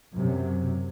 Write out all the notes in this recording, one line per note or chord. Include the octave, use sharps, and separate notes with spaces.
F#2 C3 F#3